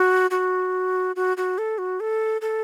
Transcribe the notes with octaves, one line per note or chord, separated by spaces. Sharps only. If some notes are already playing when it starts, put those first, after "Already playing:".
Already playing: F#4
F#4
F#4
F#4
A4
F#4
A4
A4